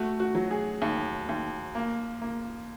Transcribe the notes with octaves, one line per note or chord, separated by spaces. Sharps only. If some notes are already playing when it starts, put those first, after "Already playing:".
Already playing: A3 F#4
F#4
F#3
G#4
D#2
D#2
A#3
A#3